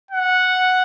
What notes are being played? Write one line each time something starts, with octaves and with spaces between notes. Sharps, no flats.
F#5